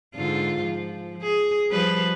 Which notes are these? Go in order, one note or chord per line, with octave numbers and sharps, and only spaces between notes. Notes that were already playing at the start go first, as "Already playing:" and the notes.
G#2 D3 F4
F3
G#4
F3 G3 B4